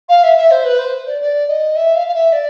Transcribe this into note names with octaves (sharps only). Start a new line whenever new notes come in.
F5
E5
E5
C5
B4
C5
D5
D5
D#5
E5
F5
F5
E5
D5